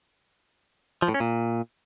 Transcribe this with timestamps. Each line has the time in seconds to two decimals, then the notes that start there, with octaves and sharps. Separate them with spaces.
1.02 F3
1.08 A2
1.14 C#4
1.20 A#2